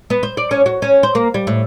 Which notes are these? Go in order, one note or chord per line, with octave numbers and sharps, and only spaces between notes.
B3
C5
D5
C#4
F#4
C#4
C5
A#3
G3
A2